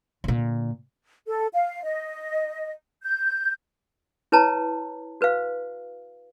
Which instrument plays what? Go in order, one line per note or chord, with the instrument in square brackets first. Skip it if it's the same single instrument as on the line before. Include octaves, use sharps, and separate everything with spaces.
[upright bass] A#2 D3
[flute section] A4
F5
D#5
G6
[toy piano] E4 B4 C#5 A5 A#5
F#4 B4 C5 F5